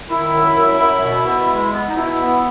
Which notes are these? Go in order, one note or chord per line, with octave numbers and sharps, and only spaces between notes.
D#3 E4
F#2
F#2
F#2
B2
B2
G#3
B3
D#4
B2 E4
B3